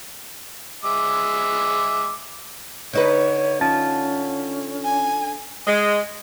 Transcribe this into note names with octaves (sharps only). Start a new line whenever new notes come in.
G#3 E5 D6
D3 D#4 B4 C#5
C#4 F4 A5
G#5
G#3